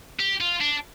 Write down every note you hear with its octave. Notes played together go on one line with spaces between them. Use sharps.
G4
F4
D4